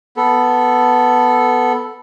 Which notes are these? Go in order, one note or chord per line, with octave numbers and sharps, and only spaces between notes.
B3 A4